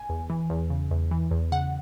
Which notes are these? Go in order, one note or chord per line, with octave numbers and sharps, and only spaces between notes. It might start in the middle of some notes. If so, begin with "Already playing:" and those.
Already playing: G#5
E2
E3
E2
C#3
E2
E3
E2
C#3 F#5